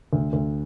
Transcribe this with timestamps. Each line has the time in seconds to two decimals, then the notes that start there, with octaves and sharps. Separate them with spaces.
0.13 D2
0.33 D2